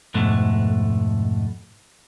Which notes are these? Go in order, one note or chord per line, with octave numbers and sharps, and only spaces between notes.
F2 G#2 B2 A3